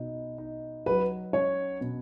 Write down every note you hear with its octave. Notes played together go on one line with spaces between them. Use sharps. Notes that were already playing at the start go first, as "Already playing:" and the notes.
Already playing: B2 D#4
D#4
F#3 B4
C#4 C#5
B2